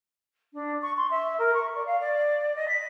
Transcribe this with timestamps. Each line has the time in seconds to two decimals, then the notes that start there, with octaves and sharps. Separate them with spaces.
0.53 D4
0.82 C#6
0.97 C6
1.10 E5
1.38 A#4
1.54 C#6
1.75 D5
1.86 F5
2.00 D5
2.55 D#5
2.68 B6